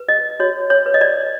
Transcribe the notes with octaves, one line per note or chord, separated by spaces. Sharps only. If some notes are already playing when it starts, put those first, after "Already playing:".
Already playing: B4
D#5
F#4 C#5
C#5
B4
D#5
D5